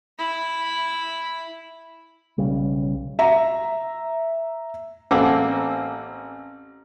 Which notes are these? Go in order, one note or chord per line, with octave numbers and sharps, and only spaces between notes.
E4 B5
B1 C#3 G3
E5 A#5
A1 A#3 C4 A4 F#5 D6